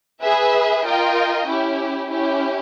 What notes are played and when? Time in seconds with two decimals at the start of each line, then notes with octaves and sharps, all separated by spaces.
0.22 G#4 B4 E5
0.85 F4 A#4 D#5 G5
1.48 C#4 E4 G4
2.10 C#4 E4 G4